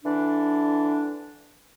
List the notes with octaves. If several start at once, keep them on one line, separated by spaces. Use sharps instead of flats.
D3 E3 D4